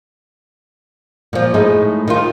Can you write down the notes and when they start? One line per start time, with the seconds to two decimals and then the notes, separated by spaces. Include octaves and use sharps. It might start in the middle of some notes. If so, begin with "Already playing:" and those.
1.33 A#2 F3
1.54 A2 G#3 D#4
2.08 D#3 F4